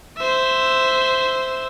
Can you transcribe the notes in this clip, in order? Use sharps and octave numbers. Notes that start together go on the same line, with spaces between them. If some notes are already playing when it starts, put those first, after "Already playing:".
C5 E5